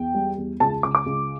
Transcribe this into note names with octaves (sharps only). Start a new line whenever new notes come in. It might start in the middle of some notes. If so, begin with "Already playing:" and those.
Already playing: E2 G5
G3
E2
C#2 A5
C#2 D6
D6
C#2